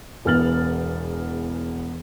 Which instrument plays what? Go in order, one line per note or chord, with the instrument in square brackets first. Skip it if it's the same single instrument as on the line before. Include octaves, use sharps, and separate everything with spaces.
[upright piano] E1 E2 B3 F6 A6 F#7